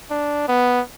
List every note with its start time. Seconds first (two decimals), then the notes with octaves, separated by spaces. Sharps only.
0.11 D4
0.48 B3